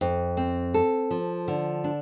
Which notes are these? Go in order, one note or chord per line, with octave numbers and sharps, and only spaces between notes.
F2
C4
A4
F3
D3
D4